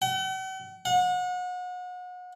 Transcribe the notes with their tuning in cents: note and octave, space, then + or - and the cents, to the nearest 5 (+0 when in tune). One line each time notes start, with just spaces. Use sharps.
F#5 +45
F#5 -35